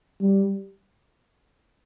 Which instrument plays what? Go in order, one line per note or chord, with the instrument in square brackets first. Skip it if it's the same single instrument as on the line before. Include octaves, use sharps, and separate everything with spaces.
[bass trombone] G3